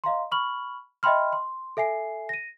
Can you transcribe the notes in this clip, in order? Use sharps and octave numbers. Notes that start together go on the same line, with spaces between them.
D#5 F5 A#5 C6
B5 C#6 F6 F#7
D#5 E5 G5 B5 C6 F6
C6
A4 E5 G#5 C7
A#6 D#7